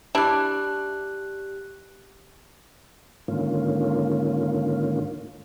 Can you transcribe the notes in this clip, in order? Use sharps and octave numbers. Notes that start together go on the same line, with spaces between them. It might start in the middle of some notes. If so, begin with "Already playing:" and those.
D4 E4 G4 F#6
G#2 D3 D#3 A#3 C#4 F4